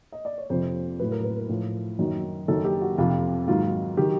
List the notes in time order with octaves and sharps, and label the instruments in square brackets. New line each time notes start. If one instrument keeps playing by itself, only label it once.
[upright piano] D#5
D5
C#5
F2 C3 F3 C5
A2 F#3 B4
A#4
B4
A#4
A2 F3
F#2 D#3 F#3
F#2 D#3 F#3 A4
G4
F#4
F2 C3 F3 F4
G#2 D#3 F#3 F4
D#3 F#3 G4